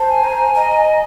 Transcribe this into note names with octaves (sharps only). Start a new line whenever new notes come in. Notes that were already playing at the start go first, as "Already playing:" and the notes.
Already playing: C5 A5
G#5
A#5
D#5 A#5